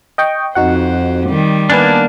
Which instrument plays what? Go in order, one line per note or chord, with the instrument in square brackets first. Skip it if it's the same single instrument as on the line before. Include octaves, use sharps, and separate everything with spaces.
[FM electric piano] D#5 G5 C#6
[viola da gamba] F2 C5 [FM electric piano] D#4 F#4 F#5
[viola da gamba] D#3 G3
[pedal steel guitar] A#3 B3 D4 [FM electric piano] B4 G#5 A5